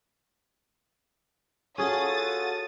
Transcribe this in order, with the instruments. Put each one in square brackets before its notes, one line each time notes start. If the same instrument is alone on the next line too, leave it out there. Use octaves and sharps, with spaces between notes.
[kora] C#4 G#4 [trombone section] F4 F#4 A4 [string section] D#6 A6